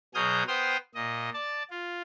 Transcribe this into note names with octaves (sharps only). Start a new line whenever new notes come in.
B2 F#3 G#4 D#6 F6 G6
B3 C5 G5 C6 D#6 F6
A#2 D#5
D5 A5
F4